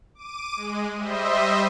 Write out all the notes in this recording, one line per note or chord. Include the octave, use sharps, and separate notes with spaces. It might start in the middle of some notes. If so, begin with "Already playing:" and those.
D6 D#7
G#3
G3 C5 D#5 E5